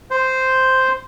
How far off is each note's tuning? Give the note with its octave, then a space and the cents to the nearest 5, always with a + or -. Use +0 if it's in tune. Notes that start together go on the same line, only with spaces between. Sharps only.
C5 -5